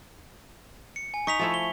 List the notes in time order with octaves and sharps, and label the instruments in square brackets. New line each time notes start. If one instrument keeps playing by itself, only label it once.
[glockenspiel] C#7
G#5
[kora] D#4 [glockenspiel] C#6 B6 F7
[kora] F3 A3 E4
[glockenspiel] G7